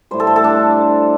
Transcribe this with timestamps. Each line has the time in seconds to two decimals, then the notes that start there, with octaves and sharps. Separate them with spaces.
0.11 A2 G3 C5
0.20 A4
0.27 C5
0.36 A4
0.44 D4